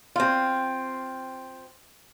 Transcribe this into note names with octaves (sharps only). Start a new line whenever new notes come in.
C4 F4